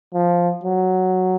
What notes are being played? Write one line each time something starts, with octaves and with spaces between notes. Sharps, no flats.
F3
F#3